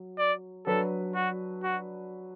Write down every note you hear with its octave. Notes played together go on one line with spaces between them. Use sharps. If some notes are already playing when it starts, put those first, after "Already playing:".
Already playing: F#3
D5
F#3 D4 A4 B4
F#4
F#4